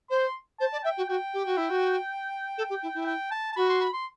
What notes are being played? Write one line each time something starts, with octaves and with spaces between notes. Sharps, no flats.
C5 C6
C5 A5
D5
E5 G5
F#4
F#4 G5
G4
F#4
E4
F#4
A4
G4
E4
E4
G5
A5
A5
F#4 B5
C6
B5
C6